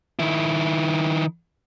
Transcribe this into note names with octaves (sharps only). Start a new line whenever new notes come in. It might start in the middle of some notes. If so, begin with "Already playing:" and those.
D#3 E4